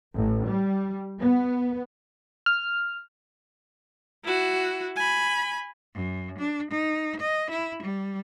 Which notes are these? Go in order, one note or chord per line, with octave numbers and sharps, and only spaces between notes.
A1
G3
B3
F6
E4 F#4
G#5 B5
F#2
D4
D#4
D#5
E4
G3